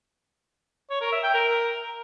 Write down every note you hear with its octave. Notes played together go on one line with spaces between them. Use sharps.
C#5
A#4
E5
G5
A#4